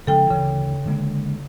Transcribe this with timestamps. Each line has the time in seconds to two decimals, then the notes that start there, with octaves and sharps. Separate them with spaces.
0.07 C#3 F3 G#3 A4 G5
0.30 D2 C#3 E3
0.86 D3 G#3 A#3